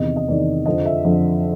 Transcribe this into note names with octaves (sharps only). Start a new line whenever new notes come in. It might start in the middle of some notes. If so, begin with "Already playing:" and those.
Already playing: E2 C3 D#3 D#5
D#5
E2 C3 D#3 D5
F2 D3 F3 D#5
E5
F2 D3 F3